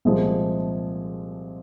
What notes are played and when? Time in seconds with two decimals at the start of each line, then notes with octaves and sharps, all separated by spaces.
0.05 C2 A#2 F3 G#3